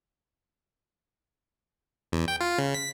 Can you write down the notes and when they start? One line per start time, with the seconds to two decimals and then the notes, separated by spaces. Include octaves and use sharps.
2.12 E2
2.28 G5
2.41 F4
2.58 C#3
2.74 B6